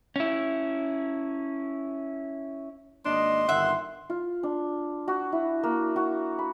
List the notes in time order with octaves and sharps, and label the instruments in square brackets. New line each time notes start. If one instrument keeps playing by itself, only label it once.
[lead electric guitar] C#4 E4
[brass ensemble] G#1 A#3 D#5 [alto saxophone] D4 [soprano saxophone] C6
[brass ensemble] G1 D#3 [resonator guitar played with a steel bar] E5 [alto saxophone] F#5
[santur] F4
D4
F#4
E4
A#3
F#4
B5